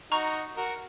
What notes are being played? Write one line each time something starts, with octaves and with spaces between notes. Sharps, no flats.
D#4 F#4 A#5 C#6
F#4 A#4